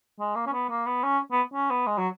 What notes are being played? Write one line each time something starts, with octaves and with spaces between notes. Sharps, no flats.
G#3
A#3
C#4
B3
A#3
B3
C#4
B3
C#4
B3
G#3
F#3